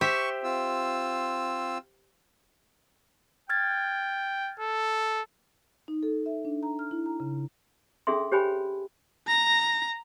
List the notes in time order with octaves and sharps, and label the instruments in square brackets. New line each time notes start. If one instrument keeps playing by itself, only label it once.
[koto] G4 C5 E5 [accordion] C#6
[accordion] C4 F4 E6
[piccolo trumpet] G5 [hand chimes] F6 G#6 A6
[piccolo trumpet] A4
[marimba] D#4
A4
E5
D4
A#5
F6
E4
A#5
C#3
[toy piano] C#4 D4 G#4 A4 E5 C6
G4 C5 C#5 G5 G#5 B5
[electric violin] A#5 A#6